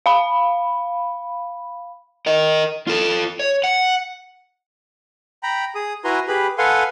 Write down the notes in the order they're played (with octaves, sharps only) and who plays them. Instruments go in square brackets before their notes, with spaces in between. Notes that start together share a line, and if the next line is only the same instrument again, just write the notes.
[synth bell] F5 B5
[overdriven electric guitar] A#4 D#5
F4 A4
C#5
F#5
[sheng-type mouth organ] G5 A#5 B5
G#4 D#6
E4 F#4 B4 G#5 A#5 C6
G4 G#4 B4 B5
A4 B4 F5 F#5 G#5 C6